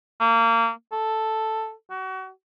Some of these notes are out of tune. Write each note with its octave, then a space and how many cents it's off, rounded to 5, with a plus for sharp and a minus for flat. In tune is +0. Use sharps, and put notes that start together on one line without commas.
A#3 -25
A4 +0
F#4 +35